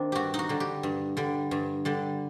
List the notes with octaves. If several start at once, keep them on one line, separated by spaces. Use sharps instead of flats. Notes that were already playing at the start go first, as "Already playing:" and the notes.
Already playing: D#3 A#3 C4 D4
G2 F#4 G4
D#4
F#4
D3 G3
G4
G2
D3 G3
G2
D3 G3